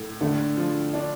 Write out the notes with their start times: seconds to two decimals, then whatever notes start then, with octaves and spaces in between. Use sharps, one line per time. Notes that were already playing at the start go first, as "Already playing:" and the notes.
Already playing: A2
0.21 D3 A3
0.57 F3
0.93 D4